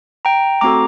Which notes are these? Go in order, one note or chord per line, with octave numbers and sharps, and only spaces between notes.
G5 A#5
A3 C4 F#4 A4 A#5 D6